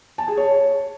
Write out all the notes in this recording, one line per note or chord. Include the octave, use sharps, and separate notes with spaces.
A5
G#4
C#5